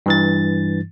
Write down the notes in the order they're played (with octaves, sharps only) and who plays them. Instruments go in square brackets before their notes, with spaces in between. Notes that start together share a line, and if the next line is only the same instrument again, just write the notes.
[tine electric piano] G2 E3 A6